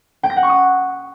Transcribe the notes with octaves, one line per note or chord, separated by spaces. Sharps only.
G5
A#6
F#5
C#6
D#6